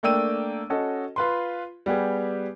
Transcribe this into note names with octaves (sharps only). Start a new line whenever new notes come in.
A3 A#3 D4 G5 E6 D#7
C#4 F#4 A4 D#5
F4 B4 C6
G3 B3 G4 G#4